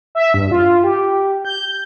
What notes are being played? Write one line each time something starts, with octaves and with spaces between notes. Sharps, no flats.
E5
G2
F4
G4
G6